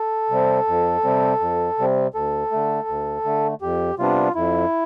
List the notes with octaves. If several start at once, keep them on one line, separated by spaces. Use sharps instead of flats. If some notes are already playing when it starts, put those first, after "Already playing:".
Already playing: A4
C3 G3 C4
F2
C3 G3 C4
F2
C3 G3 C4
D2 A4
D3 A3
D2
D3 A3
F2 G4
C3 G3 B3 D4 F4
F2 E4